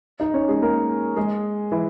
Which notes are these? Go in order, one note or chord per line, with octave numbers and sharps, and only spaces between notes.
D#4 D#5
C#4 C#5
G#3 G#4
A#3 A#4
G#3 G#4
E3 E4